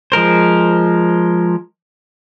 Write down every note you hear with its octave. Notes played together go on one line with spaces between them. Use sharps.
F3 G#3 A#4 C5